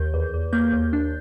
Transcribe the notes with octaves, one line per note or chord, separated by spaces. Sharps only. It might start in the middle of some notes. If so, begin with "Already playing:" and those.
Already playing: D#2 G6
E2
E2
A#3 G6
D#2
D4